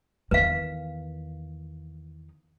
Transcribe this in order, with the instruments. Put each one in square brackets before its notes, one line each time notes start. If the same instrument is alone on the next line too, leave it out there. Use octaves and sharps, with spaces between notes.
[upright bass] E2 D#3 [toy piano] B4 F5